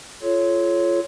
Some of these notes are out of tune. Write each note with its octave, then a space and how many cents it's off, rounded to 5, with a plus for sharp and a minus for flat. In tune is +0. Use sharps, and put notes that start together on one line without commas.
F4 -15 A4 -30 C#5 +0